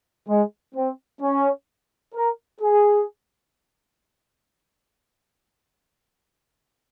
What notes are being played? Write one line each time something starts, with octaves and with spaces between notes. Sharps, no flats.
G#3
C4
C#4
A#4
G#4